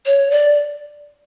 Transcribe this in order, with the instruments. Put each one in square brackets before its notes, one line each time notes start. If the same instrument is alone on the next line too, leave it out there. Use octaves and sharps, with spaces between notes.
[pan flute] C#5
D5